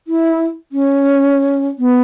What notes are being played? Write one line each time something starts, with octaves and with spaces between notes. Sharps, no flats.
E4
C#4
B3